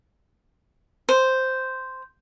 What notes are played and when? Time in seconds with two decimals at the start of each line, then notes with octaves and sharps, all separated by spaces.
1.09 C5